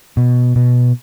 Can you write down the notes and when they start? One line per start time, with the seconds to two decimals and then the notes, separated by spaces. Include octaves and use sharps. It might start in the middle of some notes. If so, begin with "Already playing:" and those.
0.17 B2
0.56 B2